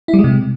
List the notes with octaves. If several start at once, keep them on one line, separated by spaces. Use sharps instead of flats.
E4
G3
G#3
C3